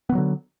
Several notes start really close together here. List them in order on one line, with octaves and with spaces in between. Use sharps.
B3 D#3 F#3 D3